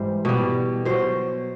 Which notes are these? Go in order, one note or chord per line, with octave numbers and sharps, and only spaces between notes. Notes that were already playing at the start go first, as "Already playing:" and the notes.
Already playing: G#2 E3 G3 C5
B2 G3
B2 F#3 C5